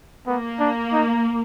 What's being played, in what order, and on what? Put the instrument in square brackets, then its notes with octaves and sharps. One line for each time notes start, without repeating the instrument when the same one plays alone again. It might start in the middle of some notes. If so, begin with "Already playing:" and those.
[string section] A#3 [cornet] B3
[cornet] D4
D#4